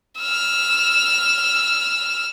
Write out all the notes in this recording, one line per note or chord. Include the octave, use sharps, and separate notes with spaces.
E6 F6